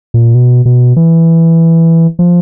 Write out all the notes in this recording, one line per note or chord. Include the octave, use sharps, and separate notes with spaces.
A#2
B2
B2
E3
F3